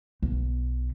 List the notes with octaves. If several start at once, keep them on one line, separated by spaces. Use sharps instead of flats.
B1